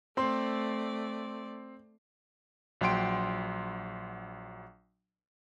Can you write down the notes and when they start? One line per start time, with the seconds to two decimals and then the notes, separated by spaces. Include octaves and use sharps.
0.17 A3 C4 D5 C6
2.81 A#1 F#3 F#5 G5 C6 D7